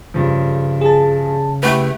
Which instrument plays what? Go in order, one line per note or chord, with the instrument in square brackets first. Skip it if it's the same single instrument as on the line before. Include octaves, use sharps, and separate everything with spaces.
[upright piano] G2 F3 [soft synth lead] C#3
[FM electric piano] G#4 A5
[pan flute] A3 [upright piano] E4 G4 G5 [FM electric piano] B4 F#5